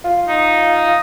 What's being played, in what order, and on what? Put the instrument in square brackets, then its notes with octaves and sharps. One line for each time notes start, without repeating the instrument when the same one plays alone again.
[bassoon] F4
[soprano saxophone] D#4